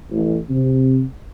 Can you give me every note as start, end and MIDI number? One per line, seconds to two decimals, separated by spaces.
0.11 0.37 33
0.50 1.02 48